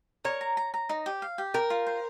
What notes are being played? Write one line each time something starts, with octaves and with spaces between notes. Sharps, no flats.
A#4 C#5
A#5
A#5
A#5
D#4
G4
F5
G4
A#4 G5
F4
C5